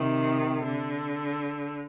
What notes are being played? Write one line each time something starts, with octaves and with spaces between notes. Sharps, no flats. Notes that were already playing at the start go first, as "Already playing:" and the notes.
Already playing: C3 D#3
D3